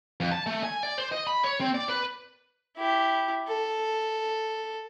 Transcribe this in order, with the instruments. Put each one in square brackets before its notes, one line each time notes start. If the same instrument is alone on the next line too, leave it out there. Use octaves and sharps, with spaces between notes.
[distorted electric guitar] F2
A5
A3
G#5
D5
C5
D#5
B5
C#5
C4
D5
B4
[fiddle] E4 G4
A4